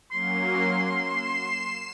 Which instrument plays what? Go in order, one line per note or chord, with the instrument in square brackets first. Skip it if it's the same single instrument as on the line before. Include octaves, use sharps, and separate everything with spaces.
[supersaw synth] F#3 A#3 C#4 [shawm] C6
[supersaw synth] C7 E7